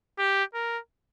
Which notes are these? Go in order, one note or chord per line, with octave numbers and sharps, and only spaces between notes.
G4
A#4